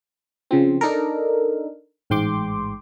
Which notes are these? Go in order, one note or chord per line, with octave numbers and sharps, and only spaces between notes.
C#3 F3 C4
D4 D#4 A4 A#4
A1 G#2 G5 C6 D6